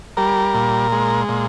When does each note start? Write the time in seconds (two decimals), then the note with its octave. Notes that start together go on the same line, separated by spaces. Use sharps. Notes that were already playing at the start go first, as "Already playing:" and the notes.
0.17 G3 A#4
0.54 A#2
0.92 G#3
1.29 A#2